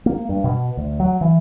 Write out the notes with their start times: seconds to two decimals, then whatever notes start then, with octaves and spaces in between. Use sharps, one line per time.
0.06 A#3
0.29 G2
0.44 B2
0.77 D2
1.00 F#3
1.21 E3